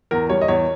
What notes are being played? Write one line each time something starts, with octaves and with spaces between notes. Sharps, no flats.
E2 A#4
G3 C#5
D#5
E2 C#5